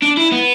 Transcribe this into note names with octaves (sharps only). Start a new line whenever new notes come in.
D4
E4
B3